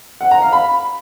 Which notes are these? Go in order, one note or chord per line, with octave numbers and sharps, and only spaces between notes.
F#5
A#5
F5
B5